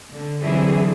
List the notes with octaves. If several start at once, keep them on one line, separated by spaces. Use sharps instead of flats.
D3
D3 E3 F#3 C4 E4 G#4